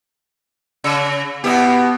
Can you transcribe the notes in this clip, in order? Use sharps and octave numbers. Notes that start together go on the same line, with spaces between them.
C#3
B2 B3 E4 G4